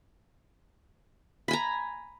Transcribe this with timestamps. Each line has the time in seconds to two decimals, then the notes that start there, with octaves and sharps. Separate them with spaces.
1.48 B5
1.51 G#5
1.53 A#5